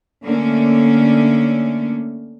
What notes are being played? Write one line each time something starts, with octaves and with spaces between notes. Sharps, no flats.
D3 A3 A#3 C#4